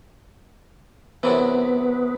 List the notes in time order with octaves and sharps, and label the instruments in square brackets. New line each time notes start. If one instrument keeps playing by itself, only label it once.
[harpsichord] F#2 C3 E3 [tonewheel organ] B3